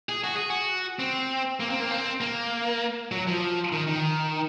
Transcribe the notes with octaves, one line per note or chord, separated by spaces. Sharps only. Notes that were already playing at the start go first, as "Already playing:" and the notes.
G#4
F#4
G#4
F#4
C4
A#3
C4
A#3
C4
A#3
F#3
F3
D#3
D#3